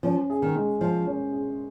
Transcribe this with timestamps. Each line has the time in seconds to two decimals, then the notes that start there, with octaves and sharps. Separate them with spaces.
0.03 F3 C#4
0.30 G#4
0.42 D#3
0.55 G#3
0.81 F3 C5
1.06 C#4
1.32 G#4